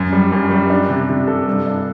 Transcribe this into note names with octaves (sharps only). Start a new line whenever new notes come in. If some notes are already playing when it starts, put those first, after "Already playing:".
Already playing: F#2
G3
F#2
G3
D4
C3
C3
A4
G2
D4